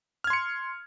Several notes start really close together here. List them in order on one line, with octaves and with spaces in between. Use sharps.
F6 G#6 C6 C#7